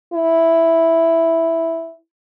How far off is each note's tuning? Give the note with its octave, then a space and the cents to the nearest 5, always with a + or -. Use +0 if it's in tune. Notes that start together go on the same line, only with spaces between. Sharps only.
E4 +0